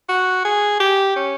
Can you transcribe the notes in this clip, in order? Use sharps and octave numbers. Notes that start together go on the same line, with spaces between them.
F#4
G#4
G4
C#4